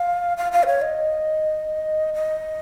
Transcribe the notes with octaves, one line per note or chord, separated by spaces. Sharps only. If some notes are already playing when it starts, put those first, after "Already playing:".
Already playing: F5
F5
F5
B4
C#5
D#5
D#5